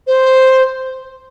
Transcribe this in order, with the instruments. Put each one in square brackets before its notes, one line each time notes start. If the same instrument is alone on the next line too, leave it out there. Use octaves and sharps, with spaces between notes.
[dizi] C5